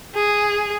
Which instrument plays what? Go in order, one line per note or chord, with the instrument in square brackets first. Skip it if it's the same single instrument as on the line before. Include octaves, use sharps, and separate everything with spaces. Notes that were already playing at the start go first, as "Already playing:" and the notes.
[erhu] G#4